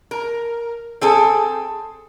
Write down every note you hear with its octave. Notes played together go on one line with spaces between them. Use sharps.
A#4
C4 G#4 A4